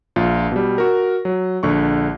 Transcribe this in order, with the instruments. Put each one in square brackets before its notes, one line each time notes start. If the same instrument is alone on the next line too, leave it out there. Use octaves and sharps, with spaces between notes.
[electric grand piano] A#1 F4
B2 G3
F#4 A#4
F#3
A#1 D3 C#6